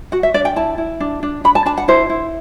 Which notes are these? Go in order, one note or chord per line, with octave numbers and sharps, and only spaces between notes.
F#4 F#5
E5
D4 D5
G5
E4 A5
E4
D4
D4
D4 B5
A5
D4 A5
F#5
E4 C5
E4